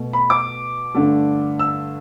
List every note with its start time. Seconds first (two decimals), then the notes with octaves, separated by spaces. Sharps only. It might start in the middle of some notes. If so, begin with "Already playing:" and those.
Already playing: B2 A3
0.13 B5
0.30 D6
0.94 G2 D3 A3
1.59 E6